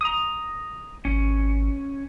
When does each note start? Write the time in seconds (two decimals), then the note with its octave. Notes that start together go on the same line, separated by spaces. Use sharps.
0.01 A#5 D#6
1.05 G#1 C#4